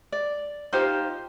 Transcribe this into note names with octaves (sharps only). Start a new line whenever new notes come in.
D5
D#4 F4 G4 C5